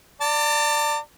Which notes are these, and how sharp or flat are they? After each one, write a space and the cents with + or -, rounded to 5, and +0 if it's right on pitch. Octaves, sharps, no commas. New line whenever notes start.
D5 +0 A5 +45